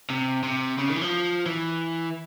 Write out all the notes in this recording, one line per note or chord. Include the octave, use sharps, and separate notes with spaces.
C3
C3
C#3
D#3
E3
F3
E3